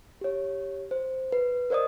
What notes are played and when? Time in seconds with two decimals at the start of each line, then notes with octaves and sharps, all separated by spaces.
0.21 G4 C#5
0.91 C5
1.32 B4
1.70 A#4 C5 D5 D#5 D#6